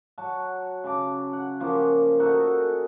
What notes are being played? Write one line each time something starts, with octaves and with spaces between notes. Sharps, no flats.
F#3 F#4 A5
C#3 A5 D6
F#5
F3 A#3 C#4 G4
D#4 F#4 A4 A#4